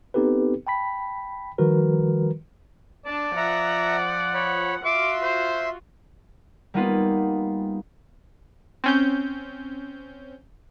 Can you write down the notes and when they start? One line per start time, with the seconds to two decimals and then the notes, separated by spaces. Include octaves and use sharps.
0.14 B3 C4 D#4 G4 A4 B4
0.67 G5 A5 B5 B6
1.58 D#3 F3 G3 F#4 A#4 B4
3.06 D4 D5 A5
3.37 F3 E5 F#5 A#5
4.34 C#5 B5
4.85 F4 F#4 E5 C6 D6
5.23 C5
6.74 G3 A#3 B3 D#4 F4 B4
8.84 C4 C#4 G6